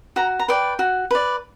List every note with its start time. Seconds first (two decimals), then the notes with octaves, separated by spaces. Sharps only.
0.16 F#4 A#5
0.39 A#5
0.48 B4 D5 G5
0.79 F#4
1.11 B4 D5